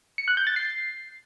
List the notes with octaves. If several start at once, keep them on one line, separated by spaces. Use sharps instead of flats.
C#7
F#6
G6
A6
C7